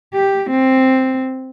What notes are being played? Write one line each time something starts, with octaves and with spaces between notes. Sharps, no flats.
G4
C4